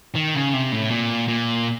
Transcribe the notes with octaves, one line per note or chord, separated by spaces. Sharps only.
D#3
C#3
C3
A2
A#2
A#2